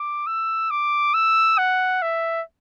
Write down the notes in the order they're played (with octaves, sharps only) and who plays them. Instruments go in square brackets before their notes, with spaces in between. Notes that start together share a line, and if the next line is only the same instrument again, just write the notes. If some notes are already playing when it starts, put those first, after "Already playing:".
Already playing: [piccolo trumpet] D6
E6
D6
E6
F#5
E5